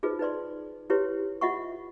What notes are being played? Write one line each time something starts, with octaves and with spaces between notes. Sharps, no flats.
D#4 F4 G#4 B4 C5 D#5
D#4 B4 D5 C6
E4 G4 B4 C#5 C6
F4 D#5 E5 F#5 B5 C#6